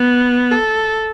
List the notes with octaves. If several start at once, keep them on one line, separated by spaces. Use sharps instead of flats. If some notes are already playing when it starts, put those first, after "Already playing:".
Already playing: B3
A4